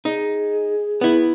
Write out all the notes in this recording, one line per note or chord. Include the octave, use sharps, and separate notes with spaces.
D#4 G#4
B3 E4